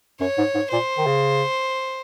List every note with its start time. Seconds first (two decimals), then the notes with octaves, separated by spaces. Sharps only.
0.20 F#2 C#5
0.38 G#2
0.55 G#2
0.72 A#2 C5
0.98 D#3
1.06 C#3